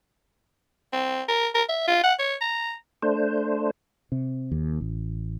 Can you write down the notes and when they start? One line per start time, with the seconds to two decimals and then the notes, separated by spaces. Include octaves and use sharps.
0.93 C4
1.28 A#4
1.54 A#4
1.69 E5
1.87 F4
2.03 F#5
2.19 C#5
2.41 A#5
3.02 A3 D4 C5
4.12 C3
4.52 D#2
4.81 A1